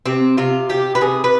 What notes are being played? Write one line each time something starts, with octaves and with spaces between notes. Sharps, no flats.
C3 C4
C3 F4
C3 G4
B4
C3 G#4
B4